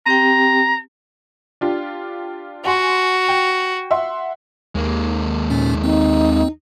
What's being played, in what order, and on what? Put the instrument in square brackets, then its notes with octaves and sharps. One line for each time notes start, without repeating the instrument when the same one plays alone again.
[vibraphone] C4 G4 G5 [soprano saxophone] A#5
[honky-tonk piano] D4 F4 G4
[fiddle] F#4 [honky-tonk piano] F#5 G#5 C6
[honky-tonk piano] G5
E5 F#5 C6
[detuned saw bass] D#2 [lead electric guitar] G#3 A#3
[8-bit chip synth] A#2 C#4
[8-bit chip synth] C4 [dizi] D#4